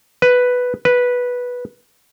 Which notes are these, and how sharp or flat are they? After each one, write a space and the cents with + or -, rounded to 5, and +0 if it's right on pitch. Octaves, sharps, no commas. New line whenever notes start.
B4 +0
B4 -10